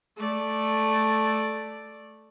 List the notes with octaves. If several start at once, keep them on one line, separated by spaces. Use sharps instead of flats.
A3 D5